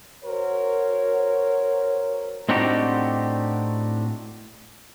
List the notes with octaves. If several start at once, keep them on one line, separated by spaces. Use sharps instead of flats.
F#4 A#4 C5 C#5
A2 C4 D4 D#4 F#4 G4